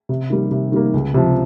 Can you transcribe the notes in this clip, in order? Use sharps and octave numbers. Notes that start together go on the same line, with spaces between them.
C3
D#3 G3 A#3
C3
D#3 G3 A#3
C#2
C3 F3